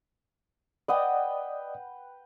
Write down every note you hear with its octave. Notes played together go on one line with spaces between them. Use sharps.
B4 D5 D#5 F#5 G5 D#6